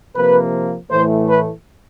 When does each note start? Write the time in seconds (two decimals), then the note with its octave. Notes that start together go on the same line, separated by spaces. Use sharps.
0.16 C3 F3 A#3 B4
0.91 A2 E3 A3 C5
1.28 B4